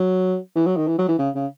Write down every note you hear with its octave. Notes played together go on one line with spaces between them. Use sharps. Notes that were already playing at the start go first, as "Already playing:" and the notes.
Already playing: F#3
E3
F#3
D#3
E3
F#3
E3
C#3
C#3